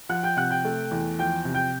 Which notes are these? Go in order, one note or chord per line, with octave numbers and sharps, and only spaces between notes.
F3 F#5 F#6
G5 G6
C3 F#5 F#6
G5 G6
A3
E2
F3 G5 G6
C3
G5 G6